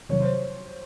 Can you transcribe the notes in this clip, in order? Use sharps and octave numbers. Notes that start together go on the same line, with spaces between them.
C3 D#3 F#3 C#5
C5